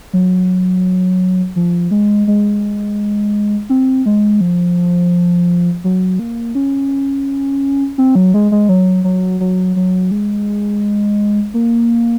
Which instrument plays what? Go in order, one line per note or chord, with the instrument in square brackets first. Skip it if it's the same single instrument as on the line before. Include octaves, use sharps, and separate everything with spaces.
[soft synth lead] F#3
F3
G#3
G#3
C4
G#3
F3
F#3
A#3
C#4
C4
F#3
G#3
G#3
F#3
F#3
F#3
F#3
G#3
A#3